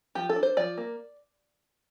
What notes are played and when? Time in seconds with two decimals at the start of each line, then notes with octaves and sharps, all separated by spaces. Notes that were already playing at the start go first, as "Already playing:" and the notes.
0.15 F3 G4
0.29 A4
0.36 D4
0.43 C5
0.57 F3 D5
0.78 A#3